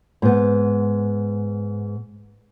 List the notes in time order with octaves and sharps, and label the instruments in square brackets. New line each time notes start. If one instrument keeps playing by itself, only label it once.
[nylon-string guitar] G#2 B3